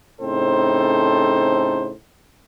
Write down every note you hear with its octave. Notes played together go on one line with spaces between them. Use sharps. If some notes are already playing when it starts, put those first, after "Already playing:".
A2 C#3 C4 D#4 A4 C5